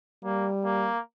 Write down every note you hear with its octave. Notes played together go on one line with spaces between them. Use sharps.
G3 A#3
A#3